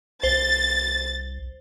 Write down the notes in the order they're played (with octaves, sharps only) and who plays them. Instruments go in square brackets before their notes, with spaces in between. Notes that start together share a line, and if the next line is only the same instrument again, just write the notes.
[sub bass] C2 [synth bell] C5 [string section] A6